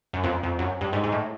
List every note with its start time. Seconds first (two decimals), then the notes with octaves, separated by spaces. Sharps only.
0.13 F#2
0.23 F2
0.43 F2
0.59 F#2
0.81 G2
0.93 G#2
1.04 G#2
1.12 A2